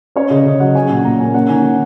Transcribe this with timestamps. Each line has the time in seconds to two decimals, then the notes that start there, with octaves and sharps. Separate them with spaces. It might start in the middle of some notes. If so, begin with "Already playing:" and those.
0.16 C#4 C#5
0.30 C#3 D#5
0.45 C#3 D#5
0.60 F#3 F#5
0.75 C#4 G#5
0.90 A#2 G#5
1.04 A#2 A#5
1.20 A#3 G#5
1.34 C#4 F#5
1.49 D#3 G#5
1.63 D#3